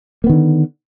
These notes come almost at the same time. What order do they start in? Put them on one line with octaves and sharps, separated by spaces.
A#3 B3 D#3 D3